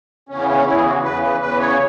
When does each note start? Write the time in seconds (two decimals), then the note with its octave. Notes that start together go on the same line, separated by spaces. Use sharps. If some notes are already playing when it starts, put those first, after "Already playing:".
0.29 E2 C#3 E3 C#4
0.41 B3
0.48 C#4
0.66 E2 C#3 E3 E4
0.76 G#4
0.85 F#4
1.03 E2 C#3 E3 B4
1.22 B4
1.41 E2 C#3 E3 B4
1.60 C#5